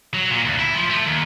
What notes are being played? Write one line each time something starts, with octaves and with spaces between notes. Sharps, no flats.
F#3
A#2
D2
E4
F3
A3
D#2